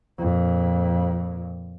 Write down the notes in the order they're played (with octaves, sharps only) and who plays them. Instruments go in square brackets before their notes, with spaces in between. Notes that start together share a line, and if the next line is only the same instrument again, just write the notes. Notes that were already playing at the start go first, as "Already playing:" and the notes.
[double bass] F2 A#2